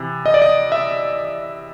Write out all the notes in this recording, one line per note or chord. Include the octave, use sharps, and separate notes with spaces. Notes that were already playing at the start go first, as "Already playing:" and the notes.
Already playing: C3 E3
D#5
D5
D#5
E5